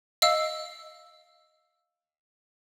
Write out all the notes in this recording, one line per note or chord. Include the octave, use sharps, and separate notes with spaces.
D#5 F5 E6